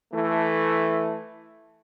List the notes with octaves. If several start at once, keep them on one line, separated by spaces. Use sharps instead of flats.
E3 A3